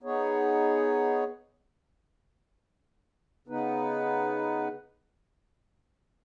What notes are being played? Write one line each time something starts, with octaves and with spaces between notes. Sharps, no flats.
B3 D#4 G#4 C#5
C#3 B3 D#4 B4